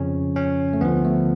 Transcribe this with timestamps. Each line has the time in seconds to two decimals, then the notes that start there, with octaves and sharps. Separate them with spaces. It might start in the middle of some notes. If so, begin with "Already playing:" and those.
Already playing: F2 C#3 F3 C#4
0.36 C#4
0.73 A3
0.81 D2 D3 F3 B3
1.05 A3